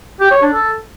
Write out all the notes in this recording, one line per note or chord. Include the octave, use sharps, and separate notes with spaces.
G4
C#5
D4
A4